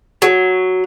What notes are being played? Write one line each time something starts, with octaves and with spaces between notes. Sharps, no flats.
F#3